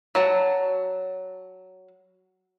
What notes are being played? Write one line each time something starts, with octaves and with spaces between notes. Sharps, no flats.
F#3 A5